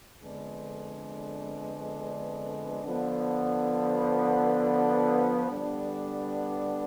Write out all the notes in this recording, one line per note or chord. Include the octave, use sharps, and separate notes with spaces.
F2 D3 G#3 B3 D4
D3 F3 B3
D3 G3 B3 D4